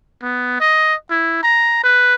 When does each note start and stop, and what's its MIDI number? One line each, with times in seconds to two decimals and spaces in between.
0.22 0.59 59
0.60 0.94 75
1.10 1.39 64
1.43 1.80 82
1.83 2.15 71